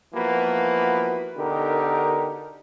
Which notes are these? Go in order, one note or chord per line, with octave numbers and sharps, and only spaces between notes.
E3 F3 A#3 B3 F#4 B4
B2 D3 D#4 G4 A#4